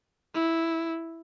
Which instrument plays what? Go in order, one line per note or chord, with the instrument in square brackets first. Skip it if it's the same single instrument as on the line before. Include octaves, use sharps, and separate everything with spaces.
[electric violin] E4